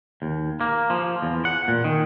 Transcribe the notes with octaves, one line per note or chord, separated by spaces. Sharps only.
D#2
A#3
F3
E2
F#5
A#2
D#3